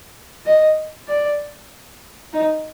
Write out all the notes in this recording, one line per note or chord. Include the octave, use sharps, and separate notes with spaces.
D#5
D5
D#4